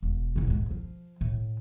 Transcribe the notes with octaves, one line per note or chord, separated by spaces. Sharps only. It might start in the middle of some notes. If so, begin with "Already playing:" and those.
E1
F2 C#3
G#2 G#3
F3
A2